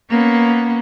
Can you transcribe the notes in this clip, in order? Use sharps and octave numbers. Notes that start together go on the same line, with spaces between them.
A#3 B3 C#4